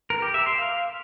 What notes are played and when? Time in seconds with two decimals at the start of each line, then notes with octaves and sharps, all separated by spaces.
0.10 A#4
0.22 G4
0.34 E5
0.46 C6
0.58 F5